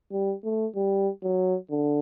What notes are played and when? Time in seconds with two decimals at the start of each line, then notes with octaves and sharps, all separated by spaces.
0.12 G3
0.44 A3
0.76 G3
1.23 F#3
1.71 D3